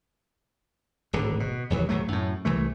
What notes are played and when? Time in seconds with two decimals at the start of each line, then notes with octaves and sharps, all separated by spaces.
1.13 D1 G#1 D3
1.40 B2
1.70 F1 D#2 E3 F#3
1.89 G#1 F#3 A3
2.08 F#2 A2
2.45 C2 E3 A3